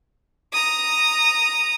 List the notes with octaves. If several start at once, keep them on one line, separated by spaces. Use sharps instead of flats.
A#5 D#6